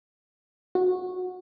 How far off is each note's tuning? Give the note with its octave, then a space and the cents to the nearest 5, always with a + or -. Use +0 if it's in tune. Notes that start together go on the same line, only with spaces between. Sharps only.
F#4 -15